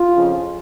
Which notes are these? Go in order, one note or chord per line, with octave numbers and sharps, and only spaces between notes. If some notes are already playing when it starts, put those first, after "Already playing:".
Already playing: F4
F2 C#3 F3